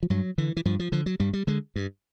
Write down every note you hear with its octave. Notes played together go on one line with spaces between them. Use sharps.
F3
G2 F#3
D3 E3
E3
G2 F3
F3
D3 F3
F#3
G2 G3
G3
D3 G#3
G2